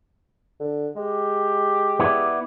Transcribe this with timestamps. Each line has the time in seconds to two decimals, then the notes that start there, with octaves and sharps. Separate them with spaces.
0.60 D3
0.96 G#3 G4
1.99 B3 E4 D5